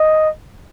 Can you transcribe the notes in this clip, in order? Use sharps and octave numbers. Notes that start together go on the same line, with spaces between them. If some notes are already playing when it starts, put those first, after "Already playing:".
Already playing: D#5